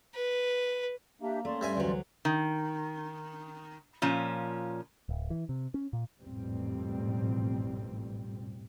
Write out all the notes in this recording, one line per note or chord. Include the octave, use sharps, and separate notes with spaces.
B4
A#3 D4 G4 E5
A3 C#4 D5 C6
G2 G3 E5 G#5
D2 E3 F#3
D#3
A#2 F3 C#4
D1
E3
C3
C#4
A#2
A1 F2 G#2 B2 G3 C4